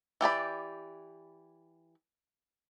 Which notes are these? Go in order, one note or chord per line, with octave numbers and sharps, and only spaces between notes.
E3 G4 D5 B5